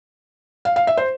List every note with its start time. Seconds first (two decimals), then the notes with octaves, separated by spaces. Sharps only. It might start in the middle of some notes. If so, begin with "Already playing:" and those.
0.65 F5
0.76 F5
0.87 E5
0.97 C5